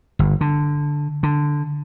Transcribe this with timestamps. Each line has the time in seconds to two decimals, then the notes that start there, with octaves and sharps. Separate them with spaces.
0.19 G1
0.41 D3
1.23 D3